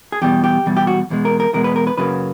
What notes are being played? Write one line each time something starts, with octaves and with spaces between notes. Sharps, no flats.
G#4
E2 B2 G3 G4
G4
E2 B2 G3
G4
F#4
E2 B2 G#3
A#4
A#4
E2 B2 G#3 A#4
B4
A#4
B4
F#2 C#3 F#3 A#3 B4